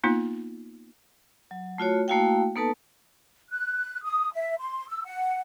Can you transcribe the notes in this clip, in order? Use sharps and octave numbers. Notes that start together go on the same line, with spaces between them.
A#3 B3 D#4 F4
F#3
A3 F4 F#4 C#5
A3 A#3 E4 F#4 F5 G5
A#3 B3 D#4 A4 B4 A5
F#6
D#6
E5
C6
E6
F#5